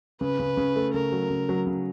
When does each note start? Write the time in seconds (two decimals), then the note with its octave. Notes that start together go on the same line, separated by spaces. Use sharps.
0.21 C#3 B4
0.39 C#3
0.57 C#3
0.76 A3
0.94 C#3 A#4
1.12 F#3
1.30 C#3
1.49 F#3
1.67 C#3